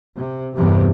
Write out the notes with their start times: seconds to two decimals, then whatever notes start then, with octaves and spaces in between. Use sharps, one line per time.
0.16 C3
0.56 E2 G2 C3